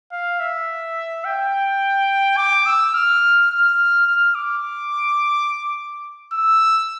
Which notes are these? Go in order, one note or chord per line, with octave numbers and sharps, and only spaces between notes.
F5
E5
G5
D6
E6
F6
F6
F6
D6
E6